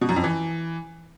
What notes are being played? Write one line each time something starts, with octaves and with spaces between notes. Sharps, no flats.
B2
F#2
F2
E3